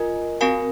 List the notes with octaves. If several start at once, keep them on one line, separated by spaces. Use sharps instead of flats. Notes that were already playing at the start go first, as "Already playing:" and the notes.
Already playing: F4 A#4 D#5 G#5
C4 F#4 A#4 F5 G#5